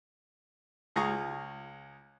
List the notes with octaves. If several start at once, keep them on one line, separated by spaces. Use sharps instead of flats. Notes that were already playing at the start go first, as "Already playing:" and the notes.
C#2 F4 G#4 A#5 C#6 D#6